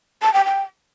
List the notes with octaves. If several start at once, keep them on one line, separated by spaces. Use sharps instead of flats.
A5
G5
G5